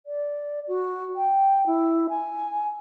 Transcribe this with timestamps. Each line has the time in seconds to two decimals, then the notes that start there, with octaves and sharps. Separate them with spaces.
0.06 D5
0.68 F#4
1.16 G5
1.67 E4
2.09 G#5